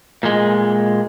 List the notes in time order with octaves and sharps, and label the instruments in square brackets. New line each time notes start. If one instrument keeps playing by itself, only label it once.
[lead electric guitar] A#2 G#3